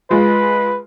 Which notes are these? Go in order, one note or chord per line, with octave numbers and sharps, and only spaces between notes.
G#3 F4 B4